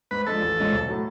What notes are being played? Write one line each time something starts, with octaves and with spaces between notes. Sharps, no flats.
G#2 B4
F3 G#3 D4 A4
A1
G#2 G#3 C#4 F4
B1
A2 F#3 A3